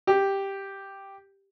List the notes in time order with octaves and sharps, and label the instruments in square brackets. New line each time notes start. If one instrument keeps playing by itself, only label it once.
[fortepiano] G4